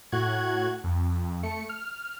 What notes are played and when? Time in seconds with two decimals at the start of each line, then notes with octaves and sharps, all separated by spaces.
0.12 A2 F#4 F#6 G#6
0.84 F2
1.43 A3 C#7
1.69 F6